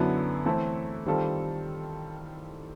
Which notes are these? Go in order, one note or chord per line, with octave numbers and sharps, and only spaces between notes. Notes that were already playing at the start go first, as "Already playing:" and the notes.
Already playing: F#2 D3 F#3 B3 E4
E3 A3 C4 E4 A4
D#3 G3 C4 F4 A4